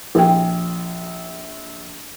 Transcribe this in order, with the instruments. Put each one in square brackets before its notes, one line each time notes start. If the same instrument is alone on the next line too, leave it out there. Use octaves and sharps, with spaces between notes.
[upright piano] A#1 [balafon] G4 G5